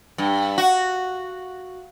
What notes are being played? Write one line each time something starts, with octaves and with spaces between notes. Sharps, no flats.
G2
F#4